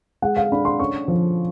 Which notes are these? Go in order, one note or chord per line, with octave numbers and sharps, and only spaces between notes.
G#3 F#5
F5
D4 B5
C6
C#4 C#6
F3